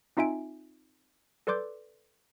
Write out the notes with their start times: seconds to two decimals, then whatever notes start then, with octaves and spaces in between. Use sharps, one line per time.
0.17 C4 D#4 F4 E5 G#5 D7
1.47 A4 B4 D5 C6 D6 G6